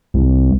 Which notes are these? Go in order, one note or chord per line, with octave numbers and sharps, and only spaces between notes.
C2